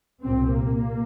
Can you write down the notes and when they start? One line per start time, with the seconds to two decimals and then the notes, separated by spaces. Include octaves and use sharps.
0.23 C2 A#2 C4
0.52 A#3